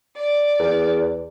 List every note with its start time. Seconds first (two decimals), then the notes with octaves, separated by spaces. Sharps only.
0.16 D5
0.59 E2